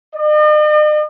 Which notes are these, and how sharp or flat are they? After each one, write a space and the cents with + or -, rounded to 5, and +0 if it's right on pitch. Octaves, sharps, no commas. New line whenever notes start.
D#5 -45